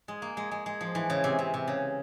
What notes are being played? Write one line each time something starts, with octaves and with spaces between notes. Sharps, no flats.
G#3
A#3
G#3
G#3
G#3
F3
E3
C#3
C3
C3
C3
C#3